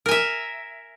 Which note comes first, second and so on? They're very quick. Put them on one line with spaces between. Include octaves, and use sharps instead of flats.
A#4 G#5 E5